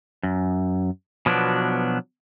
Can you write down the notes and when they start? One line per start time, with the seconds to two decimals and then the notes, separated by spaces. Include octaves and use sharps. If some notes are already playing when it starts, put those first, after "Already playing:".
0.23 F#2
1.26 B2 F3 F#3 B3 D4